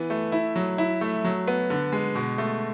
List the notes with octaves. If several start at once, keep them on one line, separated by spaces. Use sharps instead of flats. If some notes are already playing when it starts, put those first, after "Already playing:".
Already playing: E3 B3
A3
E4
F#3
E4
A3
F#3
B3
D3
G#3
B2
A3